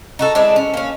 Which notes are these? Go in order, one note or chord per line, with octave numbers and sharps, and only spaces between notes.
D#4 F#4 A4
G#3 C4 D4 E4
C#4
A#3 C#4